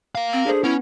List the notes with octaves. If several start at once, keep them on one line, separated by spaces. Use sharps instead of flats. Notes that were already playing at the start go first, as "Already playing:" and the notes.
A#4 F5
C4
D4 G#4 A4 C5
B3 C#4 E4